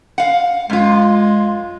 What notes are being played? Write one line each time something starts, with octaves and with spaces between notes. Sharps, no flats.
F5 F#5
F#2 G#3 F4